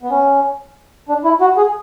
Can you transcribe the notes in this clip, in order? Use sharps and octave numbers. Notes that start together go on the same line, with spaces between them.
B3
C#4
D4
E4
F#4
G#4